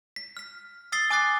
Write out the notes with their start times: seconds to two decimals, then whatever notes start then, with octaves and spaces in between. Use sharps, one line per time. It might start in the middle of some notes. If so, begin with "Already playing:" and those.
0.16 B6
0.37 F6 B6
0.92 D#6 E6 A6 B6 C7 G7
1.10 G#5 D6 D#6 F#6 A6 C7